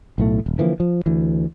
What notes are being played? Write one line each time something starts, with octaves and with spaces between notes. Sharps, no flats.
B1 A2 A3
D#1
D3 E3 F3 A#3
F3
D2 E3